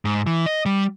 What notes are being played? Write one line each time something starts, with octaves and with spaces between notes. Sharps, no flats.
G#2
E3
D#5
G3